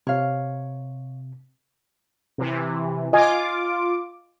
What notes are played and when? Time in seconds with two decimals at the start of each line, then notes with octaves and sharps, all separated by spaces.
0.07 C3 C#5 F5
2.38 C3 E3
3.13 F4 D#5 G#5 D6